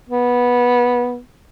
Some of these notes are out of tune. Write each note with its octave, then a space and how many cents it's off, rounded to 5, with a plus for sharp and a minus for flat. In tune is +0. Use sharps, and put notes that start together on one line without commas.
B3 -15